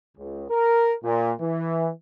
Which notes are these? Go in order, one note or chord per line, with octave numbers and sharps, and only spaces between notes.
C#2
A#4
A#2
E3